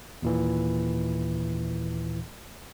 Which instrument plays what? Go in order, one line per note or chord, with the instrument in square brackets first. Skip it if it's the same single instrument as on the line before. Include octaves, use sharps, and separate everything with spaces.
[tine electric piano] D#2 A#2 E3